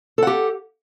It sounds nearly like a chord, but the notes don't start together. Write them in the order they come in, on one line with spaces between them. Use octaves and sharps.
A4 F#5 G4